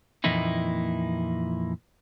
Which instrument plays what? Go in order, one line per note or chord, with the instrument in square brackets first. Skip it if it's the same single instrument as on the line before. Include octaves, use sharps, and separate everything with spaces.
[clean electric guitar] F2 A#2 E3 A#3 D#4 E4